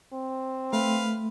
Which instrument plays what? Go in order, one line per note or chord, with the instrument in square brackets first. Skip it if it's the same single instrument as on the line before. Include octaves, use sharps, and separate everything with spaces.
[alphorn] C4
[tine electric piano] A3 [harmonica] B4 F5